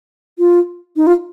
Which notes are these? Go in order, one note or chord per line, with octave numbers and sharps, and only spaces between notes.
F4
D#4
F4